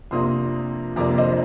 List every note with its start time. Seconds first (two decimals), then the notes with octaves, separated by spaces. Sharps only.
0.11 F2 C3 F3 A#3 D4 C6 D#6
0.96 F2 C3 F3 A#3 D4 A#5 D6
1.18 C5 D#5